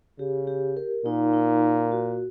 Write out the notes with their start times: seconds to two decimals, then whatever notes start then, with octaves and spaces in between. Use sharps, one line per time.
0.19 C#3 G4
0.47 G4
0.77 A#4
1.05 A#2 D#4
1.33 D#4
1.62 A#4
1.92 F#4